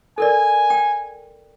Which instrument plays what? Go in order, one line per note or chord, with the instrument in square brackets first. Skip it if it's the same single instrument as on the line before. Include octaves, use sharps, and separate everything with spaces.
[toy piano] A4 A#4 D5 [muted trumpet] G#5
[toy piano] G5